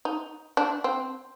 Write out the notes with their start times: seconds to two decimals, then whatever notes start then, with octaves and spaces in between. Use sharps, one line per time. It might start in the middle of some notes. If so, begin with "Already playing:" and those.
0.05 D#4
0.57 D4
0.84 C4